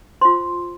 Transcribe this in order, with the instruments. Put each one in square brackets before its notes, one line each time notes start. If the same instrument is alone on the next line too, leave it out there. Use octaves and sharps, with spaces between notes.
[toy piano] F4 C5 C6